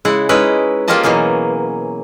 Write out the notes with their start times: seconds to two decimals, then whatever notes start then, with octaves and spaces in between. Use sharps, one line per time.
0.05 C#3 G#3 E4 F#5
0.29 G#3 C#4 D#4 E4 B4
0.88 A#3 C#4 F4 G4 D#5 A5
1.03 B2 E3 F#3 A#3 G#4